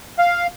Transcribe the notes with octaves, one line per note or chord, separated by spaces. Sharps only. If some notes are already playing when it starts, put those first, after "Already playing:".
F5